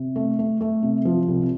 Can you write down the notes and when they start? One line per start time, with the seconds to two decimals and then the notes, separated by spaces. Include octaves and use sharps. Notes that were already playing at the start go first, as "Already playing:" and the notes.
Already playing: C3
0.16 A3
0.39 A3
0.61 A3
0.83 C3
1.05 F3
1.28 C2